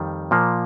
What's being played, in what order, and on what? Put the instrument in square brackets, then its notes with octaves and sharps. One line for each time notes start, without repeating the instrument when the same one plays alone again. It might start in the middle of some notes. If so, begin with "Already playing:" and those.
Already playing: [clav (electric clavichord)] F2 D#3 G3
A#2 F3 A#3